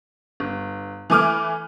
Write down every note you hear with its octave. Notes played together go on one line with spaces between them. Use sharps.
G1
E3 A3 G#5 D6 F6